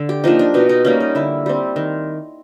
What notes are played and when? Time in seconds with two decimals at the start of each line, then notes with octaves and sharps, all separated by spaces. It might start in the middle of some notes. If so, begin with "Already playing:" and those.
Already playing: D3
0.09 G4
0.24 F3 A#3 D4 D#4
0.39 D4
0.54 B2 D#4
0.69 D#4
0.84 G3 A#3 C#4 D#4
1.00 D#4
1.15 D3 E4
1.46 G3 C4
1.76 D#3